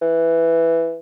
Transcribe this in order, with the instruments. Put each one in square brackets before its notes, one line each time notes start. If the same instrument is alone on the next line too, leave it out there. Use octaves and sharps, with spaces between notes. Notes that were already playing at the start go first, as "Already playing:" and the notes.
[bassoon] E3